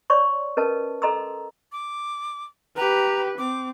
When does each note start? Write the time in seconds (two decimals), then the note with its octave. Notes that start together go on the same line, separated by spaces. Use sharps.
0.10 C#5 D5 C6 C#6
0.57 C#4 A#4 B4 D#5 A5
1.02 A4 D#5 A#5 C6 D#6 E6
1.72 D6
2.77 G4 B4 A#5
3.38 C4 D6